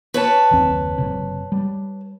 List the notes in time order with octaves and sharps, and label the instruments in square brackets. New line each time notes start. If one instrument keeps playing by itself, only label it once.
[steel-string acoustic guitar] B4 C#5 A5
[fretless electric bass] F#1 D#2 C4
F#1 C3
G3